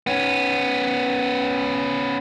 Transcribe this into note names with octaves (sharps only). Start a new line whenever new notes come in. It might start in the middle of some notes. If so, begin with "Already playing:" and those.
B3 C#4